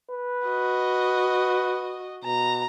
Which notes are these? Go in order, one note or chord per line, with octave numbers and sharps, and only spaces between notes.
B4
F#4 D#5
B2 A#5